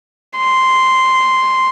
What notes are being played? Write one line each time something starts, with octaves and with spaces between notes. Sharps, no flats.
C6